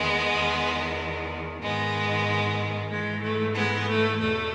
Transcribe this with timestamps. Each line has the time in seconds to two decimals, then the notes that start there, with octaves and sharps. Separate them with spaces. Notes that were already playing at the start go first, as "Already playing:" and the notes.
Already playing: E2 D#3 G#3 B3
0.34 E2 D#3
1.62 G#2 D#3 G#3 B3
2.91 G#2 E3 G#3
3.23 A3
3.55 G#3 B3
3.88 A3
4.19 E2 B2 A3